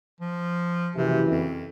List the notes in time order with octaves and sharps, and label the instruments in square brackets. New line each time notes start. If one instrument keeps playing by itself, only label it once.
[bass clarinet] F3
[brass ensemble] F#1 E3 [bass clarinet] C3
[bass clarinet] F2